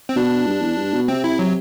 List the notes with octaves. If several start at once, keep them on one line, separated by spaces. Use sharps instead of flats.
C4
B2 D4
G2
E2
G2
B2
C3 C4
E4
F#3